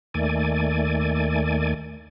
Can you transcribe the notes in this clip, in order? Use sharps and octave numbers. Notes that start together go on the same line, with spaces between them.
D#2 D#3 A3 D5 G#5